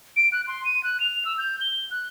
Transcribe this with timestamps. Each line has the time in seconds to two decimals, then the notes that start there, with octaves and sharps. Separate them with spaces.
0.16 D7
0.32 F#6
0.47 C6
0.65 D#7
0.83 F#6
1.00 F7
1.25 E6
1.38 G6
1.61 G7
1.91 F#6